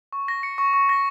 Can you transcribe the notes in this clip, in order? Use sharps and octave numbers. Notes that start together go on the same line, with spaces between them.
C#6
A#6
C#7
C#6
C#6
A#6